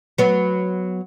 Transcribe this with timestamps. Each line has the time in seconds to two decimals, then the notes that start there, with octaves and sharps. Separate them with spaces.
0.18 F#3 B3